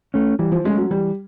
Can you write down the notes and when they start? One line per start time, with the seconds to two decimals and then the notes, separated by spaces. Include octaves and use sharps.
0.14 A3 C#4
0.39 E3 G3
0.52 F3
0.64 G#3 A3 C#4
0.77 F#3
0.90 E3 G3